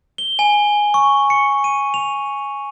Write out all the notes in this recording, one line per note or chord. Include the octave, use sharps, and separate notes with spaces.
G7
G#5
C#6
C#7
D#7
F7